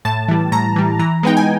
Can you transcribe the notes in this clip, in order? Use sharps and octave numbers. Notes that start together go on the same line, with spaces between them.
A2 A5
E3 G3
A2 A#5
E3 G3
E3 A#5
G#3 B3 D#4 G5
G#5